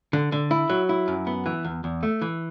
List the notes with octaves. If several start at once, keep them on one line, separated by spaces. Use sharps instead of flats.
D3
D3
E4
F#3
E4
F#2
B3
E3
E2
E2
A3
E3